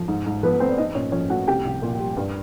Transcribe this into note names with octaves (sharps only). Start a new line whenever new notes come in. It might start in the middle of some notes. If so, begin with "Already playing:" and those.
Already playing: F3
G#2
G#2
F3 B3 B4
A3 C4 C5
D5
C4 D#4 D#5
A#2 C#4 C#5
F3 C#4 C#5
A3 F#4 F#5
C2 G4 G5
C2
A#2
G3
G2